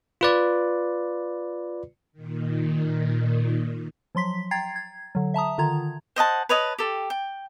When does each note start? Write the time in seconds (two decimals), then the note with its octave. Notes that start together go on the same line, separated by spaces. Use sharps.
0.21 F4 B4 D5
2.13 A#2 D#3
4.15 F3 F#3 C6 B6
4.51 G5 A#5 G#6 A6 C7
4.76 G#6
5.15 D3 F#3
5.34 E5 A5 A#5 D#6
5.58 D3 D#3 F4 A#5 G#6
6.16 C5 D#5 F#5 A5
6.49 B4 C#5 D#5 A5
6.78 G4 A4
7.10 G5